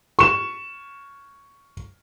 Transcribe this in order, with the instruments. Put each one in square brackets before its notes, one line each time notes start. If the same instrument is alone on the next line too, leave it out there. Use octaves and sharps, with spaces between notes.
[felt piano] C#6 E7